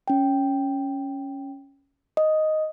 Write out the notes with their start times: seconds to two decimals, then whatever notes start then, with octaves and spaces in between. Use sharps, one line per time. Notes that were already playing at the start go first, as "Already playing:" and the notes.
0.08 C#4 G5
2.17 D#5